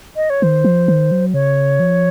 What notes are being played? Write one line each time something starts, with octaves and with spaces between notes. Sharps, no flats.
D#5
C#5
D#3 C5
F3
D#3
F#3
C#3 C#5
F3